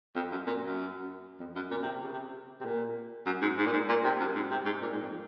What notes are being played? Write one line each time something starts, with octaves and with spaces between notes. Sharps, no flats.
F2
F#2
A#2
F#2
F2
F#2
A#2
C3
C3
C#3
C3
C3
A#2
F#2
G#2
G#2
A#2
G#2
A#2
C3
F#2
G#2
C3
G#2
A#2
G#2
F2